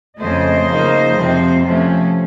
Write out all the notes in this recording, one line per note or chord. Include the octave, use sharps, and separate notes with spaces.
F2 C#3 A3 C5 D#5
C#3 F3 A#3 D#4
F2 C3 F3 C4
C3 F3 A3 C#4